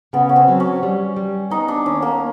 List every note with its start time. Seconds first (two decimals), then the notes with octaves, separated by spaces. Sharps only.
0.13 C#3 B3
0.29 C#4
0.36 C4
0.48 F#3
0.60 C#4
0.83 G3
1.16 G3
1.50 B3 D#4
1.68 D4
1.86 D#2 C#4
2.02 A#3